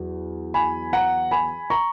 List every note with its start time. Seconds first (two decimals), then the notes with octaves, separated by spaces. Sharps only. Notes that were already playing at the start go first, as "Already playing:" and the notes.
Already playing: E2 F#3
0.54 G#5 B5
0.93 F#5 A#5
1.31 G#5 B5
1.70 A#5 C#6